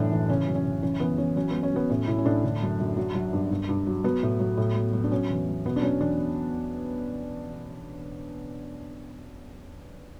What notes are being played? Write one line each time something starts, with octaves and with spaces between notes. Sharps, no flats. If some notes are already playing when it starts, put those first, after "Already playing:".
Already playing: F#2 A2 E3 D4
E3
C#3 C#4
F#2
C#4
C#3
E3 C#4
E3 B3
E3 C#4
F#3 C#4
F#3 B3
C#4
F#3 B3
A2 C#4
A2 E4
C#4
A2 D4
D3
F#2
F#2
F#3
F#3
G2
G2
G2
F#3
F#3 B3
A2
F#3
A2
F#3
F#3
D4
F#3 C#4
E2
F#3
B2 B3
D4
F#3 C#4
E2 D4